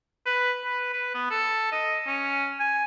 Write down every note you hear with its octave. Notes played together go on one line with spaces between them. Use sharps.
B4
B4
B4
B3
A4
D#5
C#4
G#5